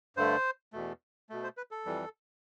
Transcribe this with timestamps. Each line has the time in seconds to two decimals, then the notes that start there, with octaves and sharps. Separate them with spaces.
0.17 G2 D3 A3 C5
0.73 E2 B2 A3
1.30 B2 A3
1.43 C5
1.57 B4
1.71 A4
1.85 F2 E3 G3